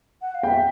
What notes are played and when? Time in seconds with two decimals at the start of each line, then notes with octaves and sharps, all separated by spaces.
0.22 F#5
0.35 F5
0.43 E5 G5